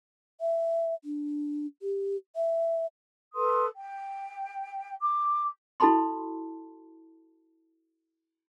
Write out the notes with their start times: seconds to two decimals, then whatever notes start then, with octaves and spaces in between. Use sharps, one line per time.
0.41 E5
1.04 D4
1.82 G4
2.36 E5
3.33 A4 B4 C6 D#6
3.76 G5
5.02 D6
5.80 E4 F#4 A4 A5 B5 C6